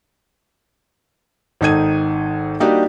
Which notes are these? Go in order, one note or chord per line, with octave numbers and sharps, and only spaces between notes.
G#1 D#3 D#4 A4 G#6 D#7
G3 A#3 D4 D#4 F#4 G4